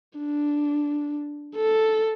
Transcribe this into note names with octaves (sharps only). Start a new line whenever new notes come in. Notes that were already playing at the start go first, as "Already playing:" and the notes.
D4
A4